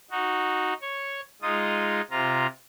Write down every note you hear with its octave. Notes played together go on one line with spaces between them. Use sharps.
D#4 F#4
C#5 C#6
G#3 D#4 F4 D#6
C3 F4 A#5